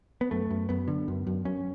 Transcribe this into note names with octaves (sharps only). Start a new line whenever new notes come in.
B3
F#2 A3
F#2
F#2 B3
D3
F#2
F#2
F#2 C#4